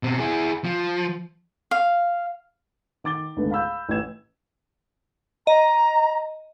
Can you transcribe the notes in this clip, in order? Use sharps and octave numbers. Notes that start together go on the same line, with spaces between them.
B2 C4
E4 G#4
F3
F5
D#3 D6 A6 G7
C#2 G#2 D3 D#3 A3 B3
F5 B5 E6 G6
A1 E3 B4 G#6 E7
D#5 A#5